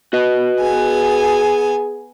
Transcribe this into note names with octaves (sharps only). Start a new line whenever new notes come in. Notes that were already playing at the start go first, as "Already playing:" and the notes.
F#4 B4 D#5
B3 G#4 G#5